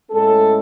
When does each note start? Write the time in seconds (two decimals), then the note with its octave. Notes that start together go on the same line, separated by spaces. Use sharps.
0.11 A2 G#3 C#4 A4